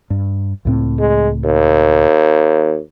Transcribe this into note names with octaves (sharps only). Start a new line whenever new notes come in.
G2
C#2 A2 C4
G#3
D#2